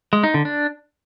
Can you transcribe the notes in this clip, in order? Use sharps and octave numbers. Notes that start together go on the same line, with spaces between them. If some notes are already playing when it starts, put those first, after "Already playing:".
G#3
D#4
D3
D4